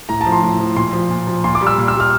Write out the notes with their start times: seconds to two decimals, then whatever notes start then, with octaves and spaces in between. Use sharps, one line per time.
0.09 A2 A#5
0.21 A5
0.26 F3
0.32 C6
0.43 A2
0.60 F3
0.76 A#2 C6
0.93 F3
1.10 A#2
1.27 F3
1.44 A#2 C6
1.55 D6
1.61 G3
1.67 E6
1.78 A#2
1.88 E6
1.94 G3
2.00 F6